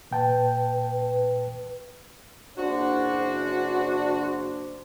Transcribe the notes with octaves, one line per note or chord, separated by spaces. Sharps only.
A#2 B4 G5 A5
F#1 D4 F#4 C5